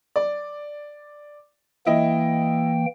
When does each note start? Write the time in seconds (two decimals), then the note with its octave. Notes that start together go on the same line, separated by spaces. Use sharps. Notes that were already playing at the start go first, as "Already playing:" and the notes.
0.16 D5
1.87 E3 A#3 E4 D#5 G5